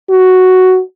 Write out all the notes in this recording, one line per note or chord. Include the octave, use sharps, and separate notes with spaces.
F#4